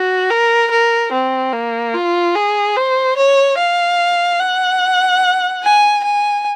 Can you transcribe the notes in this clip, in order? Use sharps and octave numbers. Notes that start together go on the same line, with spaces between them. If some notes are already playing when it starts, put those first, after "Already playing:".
Already playing: F#4
A#4
A#4
C4
A#3
F4
G#4
C5
C#5
F5
F#5
G#5
G#5